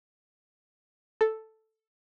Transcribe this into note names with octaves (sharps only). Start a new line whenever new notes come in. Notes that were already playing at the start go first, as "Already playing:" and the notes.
A4